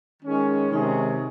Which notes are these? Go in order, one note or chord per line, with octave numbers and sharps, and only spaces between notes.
D#3 G#3 C#4 G#4
C3 D#3 G#3 C#4 G#4